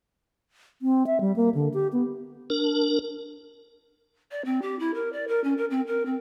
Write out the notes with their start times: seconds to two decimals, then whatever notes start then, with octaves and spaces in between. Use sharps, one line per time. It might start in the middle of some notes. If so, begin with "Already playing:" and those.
0.82 C4
1.07 E5
1.21 G3
1.36 A#3
1.54 D3
1.74 G4
1.93 B3
2.50 D4 A#4
4.31 D5
4.45 C4
4.62 G4
4.79 E4
4.94 A#4
5.12 D5
5.28 A#4
5.44 C#4
5.57 A#4
5.70 C4
5.87 A#4
6.05 C4